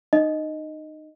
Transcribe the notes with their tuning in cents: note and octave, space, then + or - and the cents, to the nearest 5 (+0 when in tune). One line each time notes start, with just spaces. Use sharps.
D#4 -25 D#5 +0